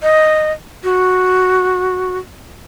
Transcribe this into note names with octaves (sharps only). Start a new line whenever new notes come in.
D#5
F#4